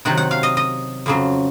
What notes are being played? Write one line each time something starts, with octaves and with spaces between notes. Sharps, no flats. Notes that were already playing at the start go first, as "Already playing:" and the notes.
C3 D#3 F#3 F#5
F#5
F5
D#5
D#5
F2 C#3 F#3